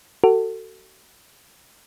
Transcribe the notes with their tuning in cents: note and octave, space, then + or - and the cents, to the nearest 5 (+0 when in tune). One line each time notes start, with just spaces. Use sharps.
F#4 +30 A4 +30